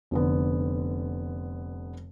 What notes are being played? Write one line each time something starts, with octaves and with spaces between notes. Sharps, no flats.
F1 D3 B3